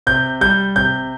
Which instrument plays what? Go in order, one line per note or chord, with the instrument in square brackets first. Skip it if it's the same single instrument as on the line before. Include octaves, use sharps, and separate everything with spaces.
[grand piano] C3 G6
G3 G6
C3 G6